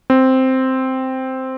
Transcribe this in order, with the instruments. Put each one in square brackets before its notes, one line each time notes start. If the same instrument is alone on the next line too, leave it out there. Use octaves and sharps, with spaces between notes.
[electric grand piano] C4